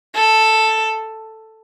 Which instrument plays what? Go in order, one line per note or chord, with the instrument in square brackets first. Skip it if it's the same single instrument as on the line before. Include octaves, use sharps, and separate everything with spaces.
[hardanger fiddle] A4